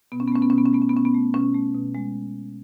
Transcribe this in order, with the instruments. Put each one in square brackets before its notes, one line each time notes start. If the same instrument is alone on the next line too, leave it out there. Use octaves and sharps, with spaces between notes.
[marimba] B2 B3
C#4
B3
A3 C#4
B3
B2 C#4
B3
C#4
A3 B3
C#4
B3
B2 C#4
B3
A3
B2 C#4
A3
B2
G#3